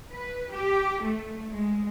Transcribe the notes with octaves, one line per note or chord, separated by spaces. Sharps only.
B4
G4
A3
G#3